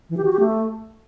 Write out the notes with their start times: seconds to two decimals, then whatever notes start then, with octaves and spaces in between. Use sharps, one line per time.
0.10 E3
0.17 G4
0.25 F#4
0.32 G4
0.40 A3